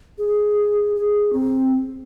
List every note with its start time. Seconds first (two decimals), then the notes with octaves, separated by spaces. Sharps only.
0.18 G#4
0.96 G#4
1.33 C4